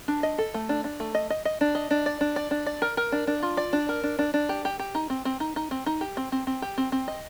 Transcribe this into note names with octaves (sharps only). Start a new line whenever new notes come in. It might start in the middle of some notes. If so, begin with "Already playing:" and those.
D4
D#5
A4
A3
D4
D4
A3
D#5
D#5
D#5
D4
D#5
D4
D5
D4
D5
D4
D5
A#4
A#4
D4
D4
F4
D5
D4
A#4
D4
D4
D4
G4
G4
G4
D#4
C4
C4
D#4
D#4
C4
D#4
G4
C4
C4
C4
G4
C4
C4
D#5